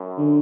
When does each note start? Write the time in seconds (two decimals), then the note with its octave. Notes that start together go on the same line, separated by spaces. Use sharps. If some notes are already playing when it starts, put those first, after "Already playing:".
Already playing: F#2
0.18 D3